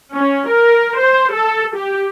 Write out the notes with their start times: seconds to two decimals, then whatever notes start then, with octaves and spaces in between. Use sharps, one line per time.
0.14 C#4
0.49 A#4
1.00 C5
1.33 A4
1.76 G4